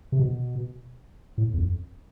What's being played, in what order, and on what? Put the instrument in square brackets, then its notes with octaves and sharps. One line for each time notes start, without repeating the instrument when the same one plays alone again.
[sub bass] C3
B2
A2
E2
F2